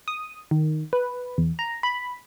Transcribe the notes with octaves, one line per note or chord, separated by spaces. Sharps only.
D#6
D#3
B4
E2
A#5
B5